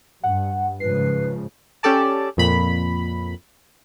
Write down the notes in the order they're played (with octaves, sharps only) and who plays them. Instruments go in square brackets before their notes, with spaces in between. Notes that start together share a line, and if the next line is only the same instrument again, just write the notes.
[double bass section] G2 [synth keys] F#5
[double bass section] G#2 C#3 F3 [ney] B4 [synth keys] C7
[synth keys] C#4 G4 A4 D5 A5
F2 A#2 B5